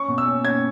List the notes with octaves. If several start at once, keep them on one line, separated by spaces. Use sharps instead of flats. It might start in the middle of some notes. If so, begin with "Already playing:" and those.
Already playing: C#4 C#6
B2
E6
C#4
C#4 G#6